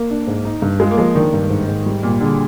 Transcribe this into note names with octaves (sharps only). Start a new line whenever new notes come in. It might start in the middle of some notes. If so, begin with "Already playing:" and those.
Already playing: A#3
D4
G#2
D#4
G2
G#3 F4
A#3
F3 G#3
D#3 D4
G2
G#2
G#2
G3
A#2 G3
D3 G#4